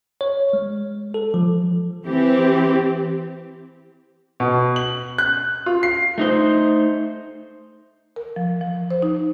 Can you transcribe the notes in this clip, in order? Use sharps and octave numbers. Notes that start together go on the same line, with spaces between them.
C#5
G#3
A4
F3
E3 C4 G4
B2
F#7
F#6
F4
C7
A3 D#4 C5
A#4
F3
F3
C5
D#4